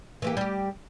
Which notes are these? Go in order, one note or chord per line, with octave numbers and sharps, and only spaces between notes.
E3 A#3 G4
G3 G4